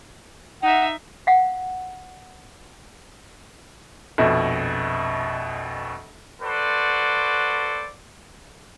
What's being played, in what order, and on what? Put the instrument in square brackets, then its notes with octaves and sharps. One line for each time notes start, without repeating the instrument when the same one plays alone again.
[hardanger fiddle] D#4 E5 [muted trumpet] F#5
[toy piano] F5 F#5
[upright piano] A#1 F2 B2
[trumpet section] F#4 A4 B4 C5 D5